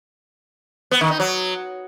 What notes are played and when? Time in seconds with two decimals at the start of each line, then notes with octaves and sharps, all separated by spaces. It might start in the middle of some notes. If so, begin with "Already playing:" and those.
0.91 B3
1.01 D#3
1.10 D#4
1.20 F#3